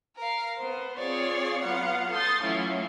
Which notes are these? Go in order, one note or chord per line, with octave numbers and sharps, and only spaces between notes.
A#4 F5
B3 C5
C4 F4 G#4 C#5 D5
F#3 B3 F4 F5 F#5
A4 C6 D#6 G6 A6
E3 F#3 A3 C#4 E4 F4